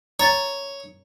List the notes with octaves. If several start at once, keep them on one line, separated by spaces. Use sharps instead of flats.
C#5 A#5 A6